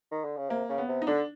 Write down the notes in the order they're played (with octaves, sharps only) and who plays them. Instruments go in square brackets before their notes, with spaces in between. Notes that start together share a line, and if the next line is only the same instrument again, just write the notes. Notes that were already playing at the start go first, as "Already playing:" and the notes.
[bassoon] D#3
D3
C#3
[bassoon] C3 [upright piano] A#3
[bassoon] C#3
[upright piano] B3
[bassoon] C3
[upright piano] D#4
[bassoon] D3 [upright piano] D4